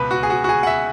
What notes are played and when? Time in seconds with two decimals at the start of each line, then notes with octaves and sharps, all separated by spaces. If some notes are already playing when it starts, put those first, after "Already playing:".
Already playing: C#2 B2 B3 B4
0.11 F#4
0.23 G#4
0.30 F#4
0.44 F#4
0.49 G#4
0.63 F#5
0.67 E5